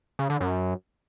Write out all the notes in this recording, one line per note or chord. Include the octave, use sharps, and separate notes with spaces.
C#3
D3
F#2